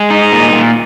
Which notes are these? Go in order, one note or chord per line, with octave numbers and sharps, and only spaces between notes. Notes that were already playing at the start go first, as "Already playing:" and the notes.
Already playing: G#3
D#4
A#2
A#2